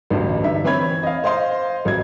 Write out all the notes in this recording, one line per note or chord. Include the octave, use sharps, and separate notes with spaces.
A1 D2 G2
G2 D3 D#4 E5
E3 C4 C#5 B5 G#6
D#5 F5
C5 D#5 F5 C6
A1 F#3 G#6